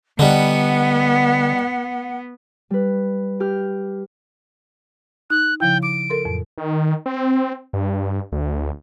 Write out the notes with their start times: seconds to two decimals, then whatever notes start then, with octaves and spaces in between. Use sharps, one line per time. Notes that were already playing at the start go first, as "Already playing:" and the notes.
0.19 D3 G3 B3 D4 D#4 F#5
2.70 G3 B4
3.40 G4 F6
5.30 D#4 F#6
5.60 C#3 F3 E4 G5
5.83 D6 D7
6.10 A4 A#4 C6
6.25 F2 A2 F#3
6.58 D#3
7.06 C4
7.73 G2
8.32 D2